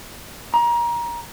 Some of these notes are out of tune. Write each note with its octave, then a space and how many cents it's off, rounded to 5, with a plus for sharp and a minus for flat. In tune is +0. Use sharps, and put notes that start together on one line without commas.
A#5 +25